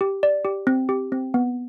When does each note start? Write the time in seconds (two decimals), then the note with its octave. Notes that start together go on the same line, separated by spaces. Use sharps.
0.01 G4
0.23 D5
0.45 G4
0.67 C4
0.89 G4
1.12 C4
1.34 B3